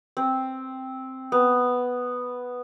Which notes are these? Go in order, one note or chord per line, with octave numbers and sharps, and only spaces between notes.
C4
B3